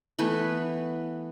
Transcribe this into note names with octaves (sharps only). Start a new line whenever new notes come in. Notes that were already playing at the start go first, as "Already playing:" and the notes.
E3 A3 B3 B4